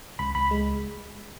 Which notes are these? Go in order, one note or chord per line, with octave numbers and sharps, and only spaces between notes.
C#2 B5
C#2 B5
G#3